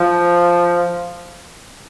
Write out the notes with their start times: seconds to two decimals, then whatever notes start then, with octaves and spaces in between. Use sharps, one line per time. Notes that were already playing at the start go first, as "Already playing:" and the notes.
Already playing: F3